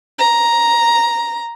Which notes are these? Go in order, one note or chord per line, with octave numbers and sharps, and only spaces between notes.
A#5